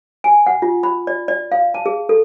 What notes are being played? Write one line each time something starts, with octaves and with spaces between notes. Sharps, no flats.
G#5
F#5
F4
B5
D5
D5
F5
A5
G#4
A4